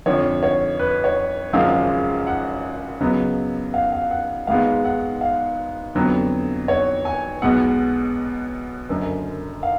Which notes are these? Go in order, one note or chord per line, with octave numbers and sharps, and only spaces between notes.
F2 D3 F3 C#5
C#5
B4
C#5
G#1 F#2 C#3 F3 G#3 F5
F#5
C#2 C#3 F#3 B3
F5
F5
F#5
G#1 G#2 G#3 B3 F5
F#5
F5
F2 D3 F#3 B3
C#5
G#5
B1 B2 G#3 B3 F#5
F#1 F#2 D3
F5